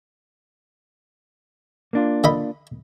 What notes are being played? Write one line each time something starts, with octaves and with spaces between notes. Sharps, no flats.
A#3 D4 F4
D3 D#5 B5